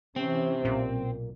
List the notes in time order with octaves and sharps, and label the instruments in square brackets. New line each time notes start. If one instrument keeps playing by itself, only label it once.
[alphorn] C3 [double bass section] E3 C#4 [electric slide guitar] C4
[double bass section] B1 [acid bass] A#2